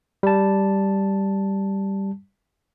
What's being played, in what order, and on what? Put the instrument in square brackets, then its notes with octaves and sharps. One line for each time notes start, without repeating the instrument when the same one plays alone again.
[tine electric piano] G3 A5